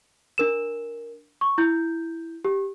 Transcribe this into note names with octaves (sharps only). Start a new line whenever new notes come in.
D4 A#4 E7
C#6
E4 G6
G4